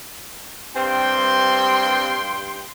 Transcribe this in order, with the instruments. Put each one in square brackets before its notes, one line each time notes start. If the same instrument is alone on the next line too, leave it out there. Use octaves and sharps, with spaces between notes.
[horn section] G2 G5 C6 [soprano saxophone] C4